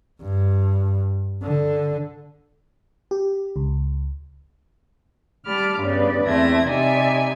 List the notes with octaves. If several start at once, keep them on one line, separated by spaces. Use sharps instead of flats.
G2
D3
G4
C#2
G3 A5 B5 D6 F6
G2 C#3 B3 B4 D5
E2 A3 C4 E5 G#6 A#6
C3 G3 D#4 D5 E5 G#5